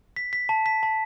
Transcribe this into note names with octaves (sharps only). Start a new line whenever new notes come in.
B6
B6
A5
B6
A5